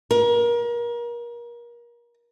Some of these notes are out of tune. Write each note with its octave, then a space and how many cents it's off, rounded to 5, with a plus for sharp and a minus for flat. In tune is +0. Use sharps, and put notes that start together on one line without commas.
A#4 +30